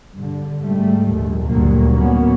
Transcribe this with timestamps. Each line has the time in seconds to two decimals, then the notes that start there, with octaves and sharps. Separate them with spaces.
0.15 G2 D3
0.62 G#2 G3 A3
1.14 A#1 D#2
1.47 D2 G2 A#2 D3 F#3 A#3
1.94 A2 F#3 A#3 B3 C#4